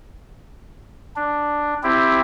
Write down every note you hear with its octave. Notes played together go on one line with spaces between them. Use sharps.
D4
C4 E4 G4